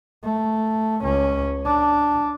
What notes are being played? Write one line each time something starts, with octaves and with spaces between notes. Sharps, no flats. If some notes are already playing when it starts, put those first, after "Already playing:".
A3
C#2 C#4
D4